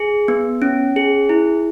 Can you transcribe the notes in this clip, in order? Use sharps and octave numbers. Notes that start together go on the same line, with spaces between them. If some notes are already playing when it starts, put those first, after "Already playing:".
Already playing: G#4
B3
C#4
G#4
E4